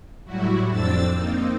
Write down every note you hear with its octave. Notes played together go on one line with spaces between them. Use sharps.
A2 F#3 G3 E4 F#4
F2 C4 D4 E6 A6
A#3 C4 D#4